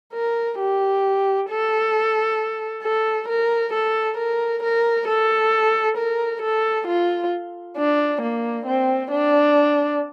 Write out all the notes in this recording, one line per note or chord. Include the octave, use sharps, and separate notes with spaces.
A#4
G4
A4
A4
A#4
A4
A#4
A#4
A4
A#4
A4
F4
D4
A#3
C4
D4